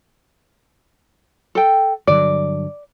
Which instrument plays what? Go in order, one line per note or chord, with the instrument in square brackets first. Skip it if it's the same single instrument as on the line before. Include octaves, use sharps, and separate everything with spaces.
[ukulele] A4 G5
[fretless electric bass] G2 D3 F#3 [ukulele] D5